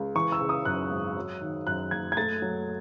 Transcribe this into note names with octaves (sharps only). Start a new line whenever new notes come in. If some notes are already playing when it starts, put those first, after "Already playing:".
Already playing: C#2
E3 C#6
E6
C#3
D#6
F#2 F#6
G#1
F#3
D#3
F#2 F#6
F#1 G#6
G#6
A3 A6
F#3